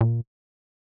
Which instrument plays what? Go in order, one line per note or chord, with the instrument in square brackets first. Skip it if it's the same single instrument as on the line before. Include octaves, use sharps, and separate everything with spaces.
[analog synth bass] A#2